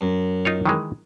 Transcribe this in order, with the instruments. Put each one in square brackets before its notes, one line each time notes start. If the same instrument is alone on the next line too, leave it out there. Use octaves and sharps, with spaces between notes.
[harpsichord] F#2
[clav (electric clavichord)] D#4 F4 C#5
D#3 E3 G#3